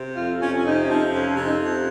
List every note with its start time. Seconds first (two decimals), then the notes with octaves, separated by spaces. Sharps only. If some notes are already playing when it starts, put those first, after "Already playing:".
Already playing: C3
0.16 F2 F4
0.41 F2 C#4
0.54 C#4
0.64 C3 D#4
0.82 C#4
0.88 F3 D#4
1.12 F2 C#4
1.36 C3 C#4
1.43 D#4
1.59 F2